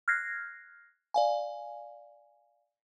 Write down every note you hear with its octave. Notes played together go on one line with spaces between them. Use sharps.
F6 F#6 G#6 A#6 C7
D5 F5 G#5